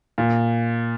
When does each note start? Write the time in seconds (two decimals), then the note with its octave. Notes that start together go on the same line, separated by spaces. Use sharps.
0.18 A#2